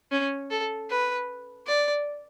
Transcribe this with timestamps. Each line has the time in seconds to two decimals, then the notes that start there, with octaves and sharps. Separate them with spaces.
0.11 C#4
0.50 A4
0.90 B4
1.67 D5